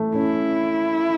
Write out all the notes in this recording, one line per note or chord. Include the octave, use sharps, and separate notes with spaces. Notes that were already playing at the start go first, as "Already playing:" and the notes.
Already playing: E3 A3
C#4 E4